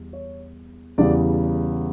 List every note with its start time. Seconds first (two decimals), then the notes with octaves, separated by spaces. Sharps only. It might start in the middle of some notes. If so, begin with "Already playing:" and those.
Already playing: E2 G3
0.13 C#5
0.98 E2 C#3 E3 G3 D5